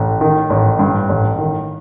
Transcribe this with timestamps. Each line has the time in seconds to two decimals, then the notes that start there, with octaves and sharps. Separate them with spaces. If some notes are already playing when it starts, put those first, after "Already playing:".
Already playing: A1
0.21 D#3
0.50 A1
0.79 G2
1.09 A1
1.38 D#3